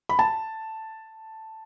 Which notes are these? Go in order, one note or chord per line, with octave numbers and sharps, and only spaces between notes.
B5
A5